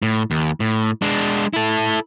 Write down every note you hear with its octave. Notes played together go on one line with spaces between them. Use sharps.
A2
D#2
A2
G#3 D4
E4 A4